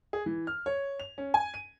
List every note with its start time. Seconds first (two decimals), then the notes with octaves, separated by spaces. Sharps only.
0.13 G#4
0.26 E3
0.47 F6
0.66 C#5
1.00 F7
1.18 C#4
1.34 G#5
1.54 D#7